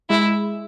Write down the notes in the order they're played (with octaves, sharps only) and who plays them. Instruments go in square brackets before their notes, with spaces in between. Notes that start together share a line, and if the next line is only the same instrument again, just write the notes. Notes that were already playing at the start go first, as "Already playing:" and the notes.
[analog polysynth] G#3 [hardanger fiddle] E4